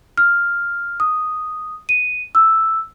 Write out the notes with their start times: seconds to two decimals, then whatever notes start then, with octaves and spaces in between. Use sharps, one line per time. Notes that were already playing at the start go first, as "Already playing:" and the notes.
0.18 F6
1.00 D#6
1.89 D#7
2.35 E6